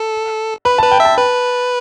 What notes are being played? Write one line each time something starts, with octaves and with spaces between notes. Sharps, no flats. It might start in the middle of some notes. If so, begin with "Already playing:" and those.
Already playing: A4
B4 B5
B4 A5
G5
E5
A5
B4